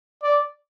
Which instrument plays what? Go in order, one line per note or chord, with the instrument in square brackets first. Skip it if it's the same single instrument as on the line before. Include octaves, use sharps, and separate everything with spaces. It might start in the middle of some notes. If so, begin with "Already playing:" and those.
[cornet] D5